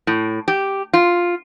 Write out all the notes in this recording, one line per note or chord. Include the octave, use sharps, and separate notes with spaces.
A2
G4
F4